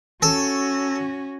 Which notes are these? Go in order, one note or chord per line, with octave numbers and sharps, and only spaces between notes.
C#4 F#4 A4